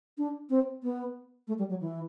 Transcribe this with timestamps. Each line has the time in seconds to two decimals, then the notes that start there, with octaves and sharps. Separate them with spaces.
0.18 D4
0.50 C4
0.83 B3
1.47 A3
1.58 G3
1.69 F#3
1.80 E3